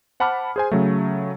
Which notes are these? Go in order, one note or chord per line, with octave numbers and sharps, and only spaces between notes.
C5 F#5 A5 B5 D6 F6
G#4 C5 G#5
C#3 F#3 A3